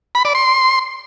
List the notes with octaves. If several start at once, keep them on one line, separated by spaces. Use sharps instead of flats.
B5
D5
C6